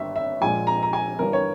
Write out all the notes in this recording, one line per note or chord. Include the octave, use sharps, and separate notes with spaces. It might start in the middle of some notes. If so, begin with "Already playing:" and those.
Already playing: G1 G2 D#3 E5
E5
A#1 A#2 G#3 G#5
A#5
A#5
G#5
G1 G2 E3 G3 A#4
C#5